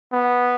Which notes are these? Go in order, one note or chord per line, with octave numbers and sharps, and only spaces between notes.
B3